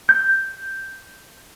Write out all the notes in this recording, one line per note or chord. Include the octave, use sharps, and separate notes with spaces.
G6